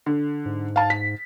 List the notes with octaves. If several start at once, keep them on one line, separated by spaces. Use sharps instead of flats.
D3
G#2
F5 A5
B6